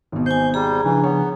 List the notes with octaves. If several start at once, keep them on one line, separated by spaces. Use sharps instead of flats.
G#1 B2
C5 G#5 G6
G3 G#4 A#5
C#3 E3 F3 D4
B3 C#5